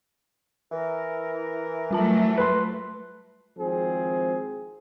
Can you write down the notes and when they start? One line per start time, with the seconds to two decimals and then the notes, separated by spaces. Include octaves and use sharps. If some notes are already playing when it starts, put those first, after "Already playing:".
0.72 E3 A#4
1.91 F#3 G3 A3 F4 A5
2.38 B4 C6
3.58 G#1 F3 C4 G#4